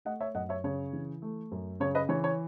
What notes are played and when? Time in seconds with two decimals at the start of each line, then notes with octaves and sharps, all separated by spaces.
0.05 A3 D#5 F#5
0.21 C#5 E5
0.35 F#2 D#5 F#5
0.49 C#5 E5
0.64 C#3 C#5
0.93 E3
1.22 A3
1.52 F#2
1.80 C#3 C#5
1.95 B4 D#5
2.09 E3 C#5
2.24 C#5